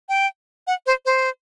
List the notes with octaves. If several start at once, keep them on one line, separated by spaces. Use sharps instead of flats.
G5
F#5
C5
C5